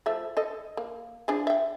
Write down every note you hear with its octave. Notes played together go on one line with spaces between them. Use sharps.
F3 A3 E5
A4 D#5
A#3
F3 D4 G#4
E5 G5